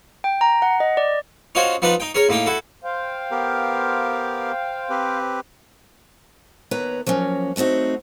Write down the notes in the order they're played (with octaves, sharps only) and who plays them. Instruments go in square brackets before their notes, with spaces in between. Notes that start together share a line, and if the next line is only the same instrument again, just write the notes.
[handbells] G5
A#5
F#5
D#5
D5
[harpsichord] C#4 D#4 F4 F#4 C5 C#5
F3 B3 D4 D#4 B4 D#5
D#4 G5
C#4 G#4 A#4 C#5
A2 A#3 D#4 G5
E4 F#4 A4
[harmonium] C5 F5 G5
[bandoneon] B3 G4 A#4
C4 G4 B4
[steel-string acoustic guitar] D#2 B3 B4 C#5 A#5
F3 F#3 A#3 C#4
F#3 A3 C4 D#4 F#4